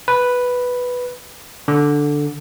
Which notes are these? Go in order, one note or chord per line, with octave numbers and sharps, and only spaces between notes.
B4
D3